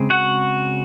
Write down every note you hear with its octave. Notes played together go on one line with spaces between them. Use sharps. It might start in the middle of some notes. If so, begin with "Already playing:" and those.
Already playing: C#3 G#3 C4
F#4 F#5